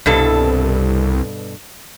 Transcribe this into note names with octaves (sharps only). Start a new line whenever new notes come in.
C2 G2 B2 A4